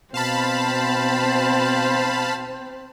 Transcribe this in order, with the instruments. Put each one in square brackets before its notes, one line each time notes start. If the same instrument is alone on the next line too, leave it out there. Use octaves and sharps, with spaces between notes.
[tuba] B2 [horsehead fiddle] C4 C5 [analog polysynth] F5 A5 B5